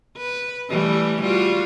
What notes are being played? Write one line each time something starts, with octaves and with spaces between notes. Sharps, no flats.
B4
E3 G3 A3
G3 F4 F#4